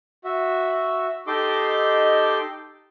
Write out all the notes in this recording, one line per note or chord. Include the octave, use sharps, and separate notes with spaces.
F#4 E5
D#4 G4 A4 D#5 C6 D6